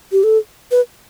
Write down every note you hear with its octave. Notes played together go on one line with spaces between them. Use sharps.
G4
A4
B4